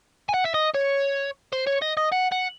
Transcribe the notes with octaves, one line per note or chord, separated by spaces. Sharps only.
G#5
F#5
E5
D#5
C#5
C5
C#5
D#5
D#5
F#5
F#5